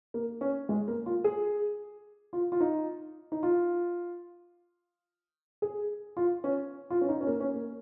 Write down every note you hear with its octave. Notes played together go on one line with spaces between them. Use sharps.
A#3
C#4
G#3
A#3
F4
G#4
F4
F4
D#4
D#4
F4
G#4
F4
C#4
F4
C#4
D#4
C#4
A#3
C#4
A#3